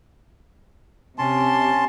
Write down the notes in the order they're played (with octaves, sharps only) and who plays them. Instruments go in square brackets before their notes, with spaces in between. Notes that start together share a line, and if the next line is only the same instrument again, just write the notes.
[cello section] C3 G4 [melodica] C#4 A5 C6